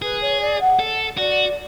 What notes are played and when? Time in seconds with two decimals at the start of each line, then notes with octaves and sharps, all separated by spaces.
0.02 G#4 B4
0.21 C#5
0.41 D5
0.60 F#5
0.79 A4
1.18 F#4 D5